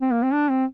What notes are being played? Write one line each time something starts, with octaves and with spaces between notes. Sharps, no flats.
C4
A#3
C4
D4
C4